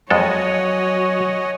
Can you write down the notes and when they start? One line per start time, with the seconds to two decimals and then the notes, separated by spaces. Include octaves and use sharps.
0.10 F2 F#3 G#3 A4 C#5 D#5 F#5 G#5